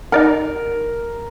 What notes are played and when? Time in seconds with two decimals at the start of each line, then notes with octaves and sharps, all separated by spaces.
0.12 D#4 A#4 D5 F#5